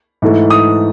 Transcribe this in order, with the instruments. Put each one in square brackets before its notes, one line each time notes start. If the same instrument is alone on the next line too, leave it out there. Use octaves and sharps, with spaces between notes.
[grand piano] G#2 E3 A3
D#6